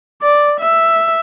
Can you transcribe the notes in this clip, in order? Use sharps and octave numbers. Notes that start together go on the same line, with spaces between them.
D5
E5